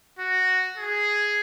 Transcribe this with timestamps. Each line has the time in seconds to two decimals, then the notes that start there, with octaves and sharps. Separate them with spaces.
0.19 F#4
0.78 G#4